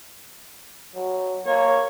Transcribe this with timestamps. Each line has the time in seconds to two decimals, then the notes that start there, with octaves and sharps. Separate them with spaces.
0.95 F#3
1.46 A#3 C#5